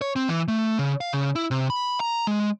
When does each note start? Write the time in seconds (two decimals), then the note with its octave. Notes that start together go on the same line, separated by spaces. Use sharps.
0.01 C#5
0.16 C4
0.29 E3
0.48 A3
0.79 C#3
1.01 F5
1.13 C#3
1.35 E4
1.51 C3
1.70 B5
2.00 A#5
2.27 G#3